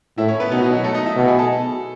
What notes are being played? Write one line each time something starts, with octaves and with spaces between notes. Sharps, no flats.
A2 E4 E5
C#4 C#5
B3 B4
B2 D#4
F#4
E4
F#3 F#4
A3 A4
D#4 D#5
E4 E5
B2
G#4 G#5
A4 A5